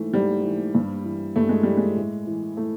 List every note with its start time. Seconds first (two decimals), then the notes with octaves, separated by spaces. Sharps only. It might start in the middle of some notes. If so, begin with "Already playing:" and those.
Already playing: G#2 E3 A3
0.13 G#2 G3
0.43 E3
0.75 G2
1.05 E3
1.36 G2 A3
1.49 G#3
1.63 E3 G3
1.77 G#3
1.97 A2
2.27 E3
2.57 A2 A3